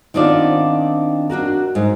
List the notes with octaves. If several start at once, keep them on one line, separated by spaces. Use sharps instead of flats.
D#3 B3 C4 D4 F4 D5
D4 D#4 F#4 A#4
G#2